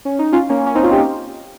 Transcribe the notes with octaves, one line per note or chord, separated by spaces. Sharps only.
C#4
D#4
C#4 F4
A#3 C#4
A#3 C#4
C4 D#4
C#4 F4
D#4 G4